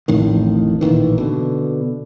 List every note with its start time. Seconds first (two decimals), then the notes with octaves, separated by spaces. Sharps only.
0.08 A1 F2 A2 D#3
0.81 A1 A#2 D#3 E3
1.18 B2 D3